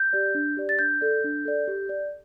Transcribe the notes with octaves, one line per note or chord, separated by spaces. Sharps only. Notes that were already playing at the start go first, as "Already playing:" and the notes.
Already playing: G6
G4 D5
D4
G4 D5
A6
D4 G6
A4 D5
D4
A4 D5
G4
D5